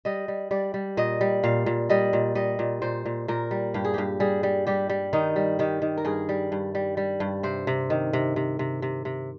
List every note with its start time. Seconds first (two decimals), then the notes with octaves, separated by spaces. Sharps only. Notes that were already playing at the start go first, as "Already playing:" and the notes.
0.05 G3 D#5
0.28 G3
0.51 G3 D5
0.74 G3
0.97 A#2 D#5
1.21 G3
1.43 A#2 F5
1.66 A#2
1.90 G3 D#5
2.13 A#2
2.35 G3 D#5
2.59 A#2
2.82 A#2 C5
3.06 A#2
3.28 A#2 A#4
3.51 G3
3.74 G2 G4
3.85 G#4
3.94 G2 G4
4.20 G3 G#4
4.43 G3
4.67 G3 G4
4.90 G3
5.13 D#3 D#4
5.36 G3
5.59 D#3 G4
5.82 D#3
5.98 A#4
6.05 G2 G#4
6.29 G3
6.52 G2
6.75 G3
6.97 G3
7.20 G2
7.43 C3 C5
7.67 C3
7.90 D#3
8.13 C3
8.36 C3
8.59 C3
8.82 C3
9.05 C3